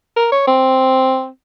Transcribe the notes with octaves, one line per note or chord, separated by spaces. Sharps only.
A#4
C#5
C4